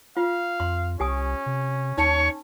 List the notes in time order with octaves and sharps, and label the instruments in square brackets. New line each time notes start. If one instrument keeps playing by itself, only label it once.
[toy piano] F4 [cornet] F5
[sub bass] F2 [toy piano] C6
[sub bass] C2 [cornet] C#4 [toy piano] G4 G#5 D#6
[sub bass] C3
[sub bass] D#2 [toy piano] D#4 A5 [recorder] C#5